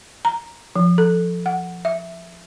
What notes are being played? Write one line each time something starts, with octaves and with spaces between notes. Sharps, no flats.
A#5
F3
A4
F#5
E5